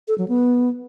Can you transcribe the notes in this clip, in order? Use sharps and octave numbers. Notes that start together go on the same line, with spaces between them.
A4
F#3
B3